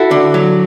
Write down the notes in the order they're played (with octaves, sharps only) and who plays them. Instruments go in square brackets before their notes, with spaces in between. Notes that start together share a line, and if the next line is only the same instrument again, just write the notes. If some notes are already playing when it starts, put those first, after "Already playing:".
Already playing: [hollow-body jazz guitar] E4 [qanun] F#4 A4
[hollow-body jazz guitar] D3
F#3